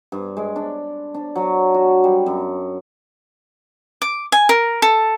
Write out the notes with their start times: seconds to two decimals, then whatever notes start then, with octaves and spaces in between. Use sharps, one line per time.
0.12 G2
0.37 G#3
0.56 D4
1.14 D4
1.36 F#3
1.74 F#4
2.04 G3
2.26 F#2
4.02 D6
4.32 G#5
4.49 A#4
4.82 A4